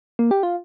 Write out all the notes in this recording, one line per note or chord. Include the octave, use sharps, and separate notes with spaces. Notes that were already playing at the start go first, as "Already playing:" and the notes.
A#3
G4
F4